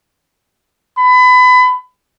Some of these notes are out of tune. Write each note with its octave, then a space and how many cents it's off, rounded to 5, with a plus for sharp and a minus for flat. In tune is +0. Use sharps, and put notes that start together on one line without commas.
B5 +25